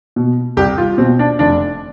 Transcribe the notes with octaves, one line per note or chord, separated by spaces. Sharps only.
B2
C2 G4
F4
B2 C4
D4
F1 D4